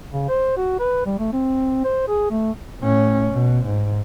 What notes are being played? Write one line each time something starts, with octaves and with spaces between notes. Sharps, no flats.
C#3
C5
F#4
B4
G3
A3
C4
C5
G#4
A3
A2 C#4
B2
G#2